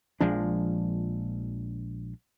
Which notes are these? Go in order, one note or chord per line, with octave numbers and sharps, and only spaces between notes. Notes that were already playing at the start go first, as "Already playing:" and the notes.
A#1 F3 G#3 D4